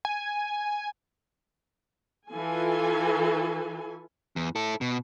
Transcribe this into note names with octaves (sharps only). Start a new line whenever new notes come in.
G#5
E3 F4 A4 G#5
E2
E4 A4
B2